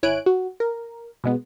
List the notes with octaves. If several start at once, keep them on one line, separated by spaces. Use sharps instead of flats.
G#1 E4 C#5 G#5 F#6 D7
F#4
A#4
B2 G#3 B3